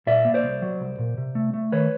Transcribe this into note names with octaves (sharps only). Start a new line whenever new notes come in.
A#2 D5 E5
A#3
C5 D5
C2
F#3
C2
A#2
C3
A3
A3
D#3 B4 C#5